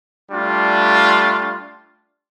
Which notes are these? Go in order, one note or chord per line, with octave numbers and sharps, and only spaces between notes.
G3 A3 D4 F4